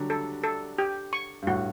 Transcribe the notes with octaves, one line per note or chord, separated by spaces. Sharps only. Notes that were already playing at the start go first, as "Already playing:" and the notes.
Already playing: D3 F#3 G3
A4
A4
G4
C#6
G2
A2 F#4